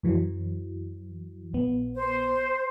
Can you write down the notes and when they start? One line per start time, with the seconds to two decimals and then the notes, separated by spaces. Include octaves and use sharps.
0.03 F#2 E3 F#3
1.53 A#1 B3
1.96 C5